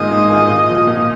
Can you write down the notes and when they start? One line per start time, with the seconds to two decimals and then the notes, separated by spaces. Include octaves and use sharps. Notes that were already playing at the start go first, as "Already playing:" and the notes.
Already playing: G#2 D#3 A#3 F4 G#4 D#5
0.11 G#2
0.29 D#3 A#3 F4 G#4
0.48 A#2
0.68 F3 A#3
0.87 A#2